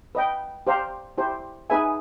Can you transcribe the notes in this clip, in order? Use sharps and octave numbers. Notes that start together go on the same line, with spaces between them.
B4 D#5 G5
G4 C5 F5 A#5
E4 G4 C5
D#4 G#4 B4 E5 G#5